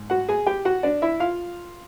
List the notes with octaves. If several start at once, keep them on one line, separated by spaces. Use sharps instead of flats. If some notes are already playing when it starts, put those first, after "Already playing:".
Already playing: G#2
F#4 F#5
G#4 G#5
G4 G5
F#4 F#5
D4 D5
E4 E5
F4 F5